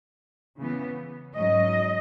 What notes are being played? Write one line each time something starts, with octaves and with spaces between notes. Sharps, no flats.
C#3 E3 B3
G#2 F#3 C#4 D#5